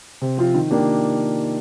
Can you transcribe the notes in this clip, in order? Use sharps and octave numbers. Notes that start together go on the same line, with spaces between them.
C3
F3 C4 F4
D#3
A#3 D4 G4